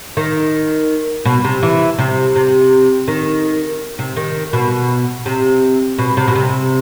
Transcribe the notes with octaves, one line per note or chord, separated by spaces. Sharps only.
D#3
B2
C3
E3
C3
C3
D#3
C3
D#3
B2
C3
B2
C3
B2
C3